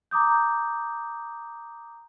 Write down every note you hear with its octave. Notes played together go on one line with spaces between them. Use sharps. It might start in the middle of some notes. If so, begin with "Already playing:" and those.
A#5 D6 D#6 G6